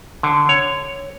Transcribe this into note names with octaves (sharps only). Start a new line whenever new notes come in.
D3
C#5